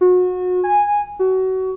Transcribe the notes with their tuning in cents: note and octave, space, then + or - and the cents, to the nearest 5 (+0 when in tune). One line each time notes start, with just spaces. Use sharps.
F#4 -30
G#5 -10
F#4 +25